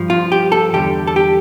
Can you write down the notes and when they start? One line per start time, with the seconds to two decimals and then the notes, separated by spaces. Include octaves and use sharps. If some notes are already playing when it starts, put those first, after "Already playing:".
Already playing: G2 F3
0.10 F4
0.32 G4
0.52 A4
0.73 E2 D3 G3 G4
1.07 A4
1.16 G4